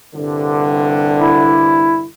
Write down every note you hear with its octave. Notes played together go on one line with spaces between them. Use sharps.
C2 G2 D3
E4